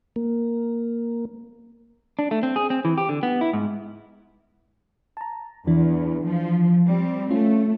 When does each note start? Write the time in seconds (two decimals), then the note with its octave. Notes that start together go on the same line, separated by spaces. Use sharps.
0.16 A#3
2.19 D4
2.31 A3
2.43 C4
2.56 G#4
2.70 C4
2.85 E3
2.98 G4
3.09 D3
3.23 B3
3.41 E4
3.53 G#2
5.17 A5 A#5
5.67 E2 E3 D4
6.25 F3
6.87 G3 C4
7.31 A3 C#4 F4